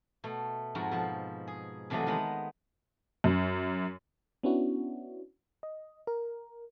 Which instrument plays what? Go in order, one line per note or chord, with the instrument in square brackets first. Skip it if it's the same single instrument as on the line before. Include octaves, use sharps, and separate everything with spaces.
[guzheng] B2 A3
F2 G#2 F#4 A#5
B2 F3
G#4
F2 C3 E3 F#3 A3 D#5
D#3 G#3 B3 F#5 B5
[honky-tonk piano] F#2
[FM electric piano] B3 C#4 D4 E4 F#4
D#5
A#4